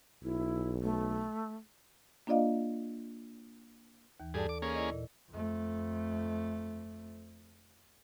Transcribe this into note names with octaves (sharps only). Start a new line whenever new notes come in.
B1 E4
A3
A#3 D4 F4 D5 D#5 F5
D#2 E3
G2 G#4 A4 D5 A5
D6
A#3 C#4 G#4
E4 D5 D#5
A#2
F2 A3